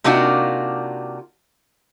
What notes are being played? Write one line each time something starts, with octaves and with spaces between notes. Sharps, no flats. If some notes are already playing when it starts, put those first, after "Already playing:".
C3 A#3 D4 D#4 F4 F#4